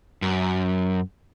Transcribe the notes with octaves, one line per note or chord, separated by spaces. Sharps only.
F#2